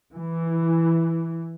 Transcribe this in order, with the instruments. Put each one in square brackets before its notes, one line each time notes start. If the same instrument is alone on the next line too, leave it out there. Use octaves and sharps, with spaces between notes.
[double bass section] E3